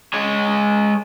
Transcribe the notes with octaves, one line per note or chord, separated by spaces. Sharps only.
G#3 C#5